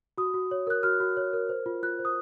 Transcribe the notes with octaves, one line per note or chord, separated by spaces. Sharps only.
F#4 D#6
F#4
C#5
A#4 F#6
F#4 F6
F#4
C#5
A#4
C5
F4
F4 F#6
C5
D#6